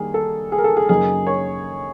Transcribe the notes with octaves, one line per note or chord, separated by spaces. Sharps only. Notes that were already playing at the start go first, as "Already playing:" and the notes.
Already playing: D#3 G3 A#3 G#4
A4
G#4
A#4
A4
G#4
F#2 C#3 F#3 A#3 D#4 G#4
C#5